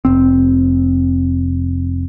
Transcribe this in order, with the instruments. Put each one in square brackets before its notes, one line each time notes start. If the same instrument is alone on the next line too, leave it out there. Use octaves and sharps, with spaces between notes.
[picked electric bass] F1 C4